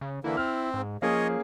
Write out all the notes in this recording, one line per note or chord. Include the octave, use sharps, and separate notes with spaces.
C#3
D3 E3 A#3 E4
C4 F6
G#2
F3 A#3 C#4 G#4 C#5 D#5